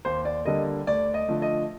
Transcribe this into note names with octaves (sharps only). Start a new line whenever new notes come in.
D#2 C5
D5
D3 G3 A#3 D#5
D2 D5
D#5
D3 F3 A3
D#5